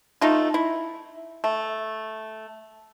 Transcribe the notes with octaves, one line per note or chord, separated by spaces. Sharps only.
A3 D#4 F4
E4
A3